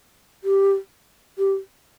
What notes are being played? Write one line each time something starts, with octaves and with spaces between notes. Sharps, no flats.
G4
G4